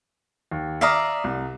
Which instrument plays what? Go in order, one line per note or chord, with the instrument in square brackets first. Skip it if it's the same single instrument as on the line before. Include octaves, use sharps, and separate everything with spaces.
[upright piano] D#2
[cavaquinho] D5 F5 A#5 [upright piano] E5 D#6
[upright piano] C2